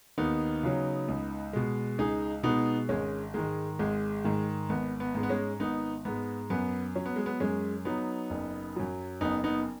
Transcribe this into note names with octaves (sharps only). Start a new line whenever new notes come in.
D#2 B3 D#4
C#3 F#3
C#2
B2 G#3
C#2 D#4 G#4
B2 G#3 B3 D#4
G#1 G#3 C#4
G#2 D#3 G#3
G#1 G#3
G#2 D#3
G#1 B3
B3
G#2 G#3
B3
G#3 C#4
G#1 B3 D#4
G#2 G#3 B3
F#2 B3
F#3 C#4
B3
G#3
B3
F#2 G#3 C#4
F#3 B3 D#4
F#1
F#2 F#3
F#1 B3 D#4
B3 D#4